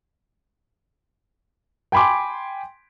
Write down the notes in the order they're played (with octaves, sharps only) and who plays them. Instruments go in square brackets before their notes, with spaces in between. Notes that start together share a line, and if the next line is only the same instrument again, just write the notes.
[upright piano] G5 G#5 B5 C6 D6